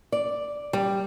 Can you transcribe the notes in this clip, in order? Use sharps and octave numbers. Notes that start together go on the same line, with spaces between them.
D5
G3